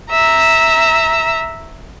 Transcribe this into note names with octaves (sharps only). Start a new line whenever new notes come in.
E5 A#5 E6